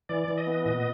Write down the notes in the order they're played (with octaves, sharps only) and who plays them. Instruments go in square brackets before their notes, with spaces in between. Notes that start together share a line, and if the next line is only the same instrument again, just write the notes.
[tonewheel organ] E3 D5
E3
D#5
B3
A#2 D#5